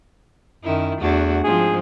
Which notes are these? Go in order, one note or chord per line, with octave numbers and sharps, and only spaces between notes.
F#2 D#3 E4
E2 A3 D4 F#4
G#2 F3 C4 G#4